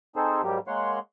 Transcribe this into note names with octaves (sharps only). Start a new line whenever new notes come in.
C4 D#4 G#4 A4 C5
G#2 F#3 G3 A#3 G4
G#3 A#3 C#5 F#5 C6